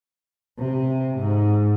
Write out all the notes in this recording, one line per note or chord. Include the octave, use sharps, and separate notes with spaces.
C3
G#2